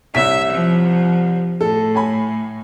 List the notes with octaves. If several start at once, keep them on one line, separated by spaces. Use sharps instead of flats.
C2 C#5 E5 B6
F3
A2 A4
C#5 G#5 B5